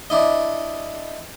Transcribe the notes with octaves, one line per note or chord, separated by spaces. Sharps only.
D4 E4 D#5